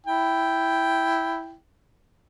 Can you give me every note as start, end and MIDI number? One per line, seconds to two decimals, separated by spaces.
0.06 1.55 64
0.06 1.55 79